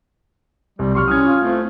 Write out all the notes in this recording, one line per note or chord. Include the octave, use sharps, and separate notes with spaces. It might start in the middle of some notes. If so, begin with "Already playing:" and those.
C2 G3
F#3 G3 C6 C#6 F6
C#4 E4 D#6 F6 G#6
F4
A3 C4